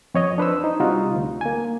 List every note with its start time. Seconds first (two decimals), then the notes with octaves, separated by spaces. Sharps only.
0.14 F2 C#5 D#5
0.38 D4 B4 C5 E6
0.64 D#4
0.80 C3 G3 D#4 F4 F#4
1.15 D2
1.41 A#3 G#5